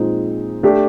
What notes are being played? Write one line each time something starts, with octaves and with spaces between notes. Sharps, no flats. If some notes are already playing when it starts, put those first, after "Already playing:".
Already playing: A#2 F3 G#3 C4 D#4
A3 D4 G4